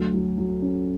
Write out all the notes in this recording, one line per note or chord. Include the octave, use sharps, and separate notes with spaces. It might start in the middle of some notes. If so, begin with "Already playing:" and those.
Already playing: D2 F#3
F#3
F#3
C#4